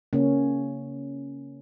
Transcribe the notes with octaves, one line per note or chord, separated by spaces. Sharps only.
C#3 A#3 C#4